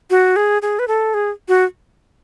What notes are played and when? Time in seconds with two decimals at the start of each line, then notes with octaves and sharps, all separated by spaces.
0.10 F#4
0.36 G#4
0.62 G#4
0.79 B4
0.88 A4
1.14 G#4
1.48 F#4